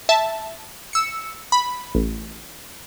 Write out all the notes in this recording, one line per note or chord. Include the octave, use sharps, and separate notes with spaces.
E5 A5
E6 C#7
B5
A1